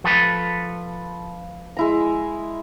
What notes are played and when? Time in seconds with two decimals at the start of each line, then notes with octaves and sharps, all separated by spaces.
0.04 F3 A4 B4
1.77 G#3 E4 A#5